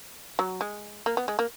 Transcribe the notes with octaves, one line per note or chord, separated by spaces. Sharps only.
F#3
G#3
A#3
B3
G#3
A#3